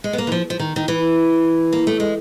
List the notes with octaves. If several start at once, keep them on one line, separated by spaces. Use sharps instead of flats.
G#3
B3
A#3
E3
F3
F3
D#3
D#3
E3
A#3
A3
G#3